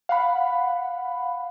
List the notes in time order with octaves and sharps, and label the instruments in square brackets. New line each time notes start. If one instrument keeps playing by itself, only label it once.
[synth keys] F5 F#5 B5